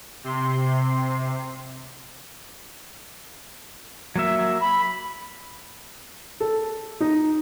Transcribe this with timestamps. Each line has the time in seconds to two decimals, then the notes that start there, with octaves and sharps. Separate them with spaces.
0.24 C3 C6
4.16 F#3 A#3 E5
4.61 B5
6.40 A4
7.00 D#4